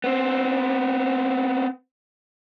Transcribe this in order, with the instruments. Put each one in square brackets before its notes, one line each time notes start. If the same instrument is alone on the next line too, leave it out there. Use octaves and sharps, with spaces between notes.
[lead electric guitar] B3 C4